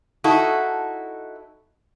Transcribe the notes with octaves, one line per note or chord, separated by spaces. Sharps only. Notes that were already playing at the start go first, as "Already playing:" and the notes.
D#4 E4 F#4 A4